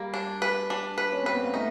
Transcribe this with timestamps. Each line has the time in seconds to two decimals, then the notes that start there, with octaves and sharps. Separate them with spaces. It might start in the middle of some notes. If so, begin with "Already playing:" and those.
Already playing: G3 A#3
0.14 D4
0.42 B4
0.70 D4
0.98 B4
1.12 C#4
1.23 C4 B4
1.33 B3
1.44 A#3
1.54 A3 D#4